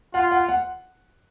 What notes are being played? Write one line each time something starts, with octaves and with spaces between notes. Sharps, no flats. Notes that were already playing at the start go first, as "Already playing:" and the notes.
F4 F#5
F#5
F#5